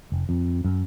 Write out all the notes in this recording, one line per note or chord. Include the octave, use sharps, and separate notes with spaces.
F1
F2
F#2